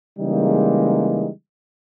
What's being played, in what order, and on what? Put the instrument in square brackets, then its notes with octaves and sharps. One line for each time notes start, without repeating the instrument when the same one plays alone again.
[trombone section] C#3 E3 G3 G#3 A#3 D#4